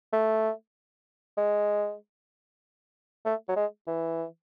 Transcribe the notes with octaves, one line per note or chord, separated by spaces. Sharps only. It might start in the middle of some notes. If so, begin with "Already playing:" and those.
A3
G#3
A3
F#3
G#3
E3